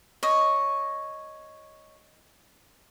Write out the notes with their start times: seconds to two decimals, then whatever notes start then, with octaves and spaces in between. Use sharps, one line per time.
0.23 C#5 D#5